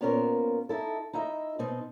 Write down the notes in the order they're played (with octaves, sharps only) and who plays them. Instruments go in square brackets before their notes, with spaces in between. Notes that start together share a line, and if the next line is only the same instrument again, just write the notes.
[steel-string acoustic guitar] A#2 B3 C#4 G4 A#4 C5
D#4 E4 A4
D#4 E4 D#5 E5
B2 C4 D#4